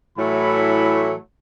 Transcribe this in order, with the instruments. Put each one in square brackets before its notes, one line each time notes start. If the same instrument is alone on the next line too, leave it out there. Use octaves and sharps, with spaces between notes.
[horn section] A2 E3 F#3 A3 E4 B5